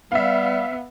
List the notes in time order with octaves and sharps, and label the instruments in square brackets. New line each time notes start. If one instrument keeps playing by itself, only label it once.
[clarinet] G3 [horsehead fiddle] B3 [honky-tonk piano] E5 F5